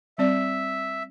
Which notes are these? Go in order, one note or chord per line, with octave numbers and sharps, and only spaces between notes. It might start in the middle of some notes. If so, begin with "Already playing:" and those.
G3 C4 D5 E5